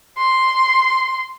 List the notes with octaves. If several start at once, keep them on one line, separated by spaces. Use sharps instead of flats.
C6